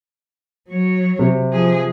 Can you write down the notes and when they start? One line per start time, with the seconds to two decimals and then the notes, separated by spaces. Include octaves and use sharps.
0.69 F#3 C#5
1.19 C3
1.52 F3 G#4